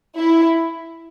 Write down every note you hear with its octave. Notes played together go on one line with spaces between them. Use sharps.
E4